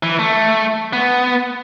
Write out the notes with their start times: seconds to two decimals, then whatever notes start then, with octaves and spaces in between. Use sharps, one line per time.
0.03 E3
0.19 A3
0.93 B3